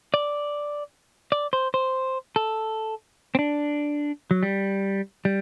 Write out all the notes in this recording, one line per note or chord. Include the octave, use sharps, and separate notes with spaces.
D5
D5
C5
C5
A4
C4
D4
F#3
G3
G3